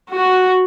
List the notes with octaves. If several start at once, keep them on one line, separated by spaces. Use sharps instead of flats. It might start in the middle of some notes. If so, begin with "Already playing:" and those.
F#4